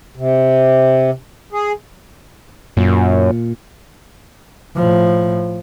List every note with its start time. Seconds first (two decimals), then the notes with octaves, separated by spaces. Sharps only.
0.17 C3
1.52 G#4
2.77 F#2 A#2
4.75 A2 F3